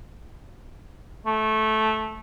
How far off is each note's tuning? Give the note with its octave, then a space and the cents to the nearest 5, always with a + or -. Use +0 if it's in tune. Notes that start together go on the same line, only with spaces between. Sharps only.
A3 -15